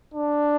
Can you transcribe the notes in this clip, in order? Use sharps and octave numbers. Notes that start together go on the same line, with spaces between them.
D4